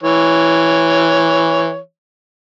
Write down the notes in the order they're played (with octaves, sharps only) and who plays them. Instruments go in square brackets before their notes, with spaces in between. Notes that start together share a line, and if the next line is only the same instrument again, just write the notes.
[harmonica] E3 C#5